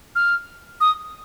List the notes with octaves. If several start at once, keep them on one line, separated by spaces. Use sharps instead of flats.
F6
D#6